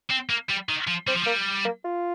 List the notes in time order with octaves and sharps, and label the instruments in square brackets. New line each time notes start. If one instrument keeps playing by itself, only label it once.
[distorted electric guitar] C4
A#3
G3
D#3
F3
[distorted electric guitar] G3 [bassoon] C4
[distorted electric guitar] F3
[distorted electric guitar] G3 [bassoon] A#3
[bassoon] A#3
F4